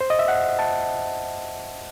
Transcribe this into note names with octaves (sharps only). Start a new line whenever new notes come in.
C5
D#5
E5
F#5
A5